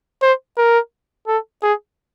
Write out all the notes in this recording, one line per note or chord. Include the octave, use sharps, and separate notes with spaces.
C5
A#4
A4
G#4